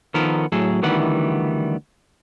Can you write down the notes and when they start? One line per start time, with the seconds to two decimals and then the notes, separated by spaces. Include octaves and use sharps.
0.14 D#3 F3 B3 A4 A#4
0.52 A2 F#3 G#4 A4
0.82 D2 D#3 E3 G3 B3 F#5